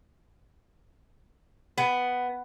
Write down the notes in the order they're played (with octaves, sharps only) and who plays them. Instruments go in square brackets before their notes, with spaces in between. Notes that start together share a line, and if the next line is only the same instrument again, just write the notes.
[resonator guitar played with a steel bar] B3